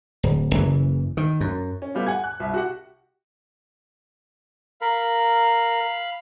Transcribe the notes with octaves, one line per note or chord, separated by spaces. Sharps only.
D1
F#1 C#3 E3
D#3
F#2
C#4
G3 A3 B3 F4 G4
F#5 G#5 G#6
F#6
C2 E5
F#4 G4 F#5
A#4 F5 B5